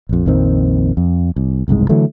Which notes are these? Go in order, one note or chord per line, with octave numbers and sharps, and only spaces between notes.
A#1 F2
A#1 F2 D#3 C4
F2
C2
F#1 C2 G#2 G#3
D3 E3 F#3 A3